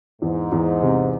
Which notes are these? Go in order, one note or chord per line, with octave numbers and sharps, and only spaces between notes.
E2 G#2
E2
C3